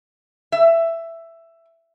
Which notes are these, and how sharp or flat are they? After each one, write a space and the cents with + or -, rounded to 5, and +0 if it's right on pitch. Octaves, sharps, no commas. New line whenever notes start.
E5 +10